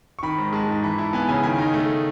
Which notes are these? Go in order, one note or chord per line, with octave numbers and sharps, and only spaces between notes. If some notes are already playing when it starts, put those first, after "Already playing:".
C#6
D#3 B5
G#2
G#3 A5
G#2 A5
E3 B5
E4 A5
B3 G#5
C#3 G#5
D#3 G#5
D#4
A3